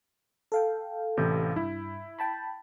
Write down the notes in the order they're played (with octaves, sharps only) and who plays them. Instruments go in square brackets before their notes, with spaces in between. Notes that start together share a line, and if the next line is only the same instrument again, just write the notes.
[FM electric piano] A4 F5 G5
[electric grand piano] A1 C3 G6
[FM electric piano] G2 [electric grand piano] E4
[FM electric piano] G5 A5 B5